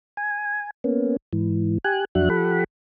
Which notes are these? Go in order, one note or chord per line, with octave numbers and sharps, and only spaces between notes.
G#5
A#3 B3 C#4
G#2 E3
G4 G#5 F#6
F2 F#3 D4 F#4 E5 F#6
F3 G4 A4 F#5 B5